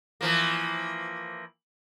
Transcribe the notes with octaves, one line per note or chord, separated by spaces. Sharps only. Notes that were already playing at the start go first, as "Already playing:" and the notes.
E3 F3 A#3